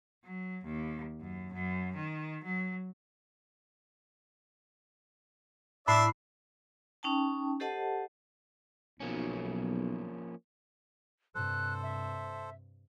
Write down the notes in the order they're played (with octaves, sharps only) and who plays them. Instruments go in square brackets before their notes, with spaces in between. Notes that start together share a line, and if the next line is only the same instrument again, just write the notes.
[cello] F#3
D#2
F#2
F#2
D#3
F#3
[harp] A2 [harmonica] D4 D5 E5 [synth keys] B5 C7
[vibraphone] C#4 D#4 G5 A5
G4 A4 C5 D#5 F#5 A5
[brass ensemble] B1 [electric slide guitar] F3 A#3 C#4
[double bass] G2 C3 [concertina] A4 C5 [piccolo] F#6
[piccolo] E5